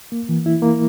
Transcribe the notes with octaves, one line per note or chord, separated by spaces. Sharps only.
A#3
E3
E4
A#3